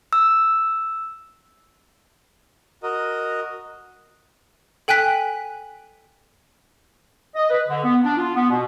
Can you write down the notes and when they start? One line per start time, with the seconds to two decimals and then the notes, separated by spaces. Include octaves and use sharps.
0.13 E6
2.83 F#4 A#4 D#5
4.88 A4 G5 G#5 F#6 B6
7.36 D#5
7.50 B4
7.69 D3
7.84 B3
8.04 D4
8.17 F4
8.36 B3
8.50 B2